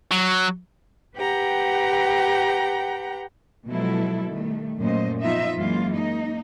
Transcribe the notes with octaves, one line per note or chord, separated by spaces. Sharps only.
F#3
G4 B4 F#5 G5 A#5
B2 F3 F#3 G#3 E4 A4
D#3 G3 A3
F#2 A#2 A3 C5 D#5
F3 B3 D#4 F4 D#5 E5
F#2 E3 G#3 A#3 F4
A#3 D#4